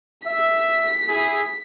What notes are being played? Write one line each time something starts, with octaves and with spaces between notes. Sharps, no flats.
E5 B6
E4 G#4